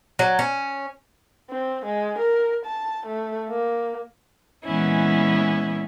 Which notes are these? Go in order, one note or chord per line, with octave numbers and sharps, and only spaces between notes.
F#3
C#4
C4
G#3
A#4
A5
A3
A#3
A#2 E3 G#3 B3 C#4 E4